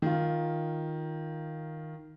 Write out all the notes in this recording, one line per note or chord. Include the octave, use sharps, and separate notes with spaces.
D#3 F4